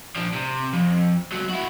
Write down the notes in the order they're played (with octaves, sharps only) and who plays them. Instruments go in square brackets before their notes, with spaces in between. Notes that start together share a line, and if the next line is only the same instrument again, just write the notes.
[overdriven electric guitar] F3 D4
C3
F2
C#2 F#3
E4 F#4